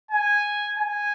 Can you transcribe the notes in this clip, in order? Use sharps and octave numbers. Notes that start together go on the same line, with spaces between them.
G#5
G#5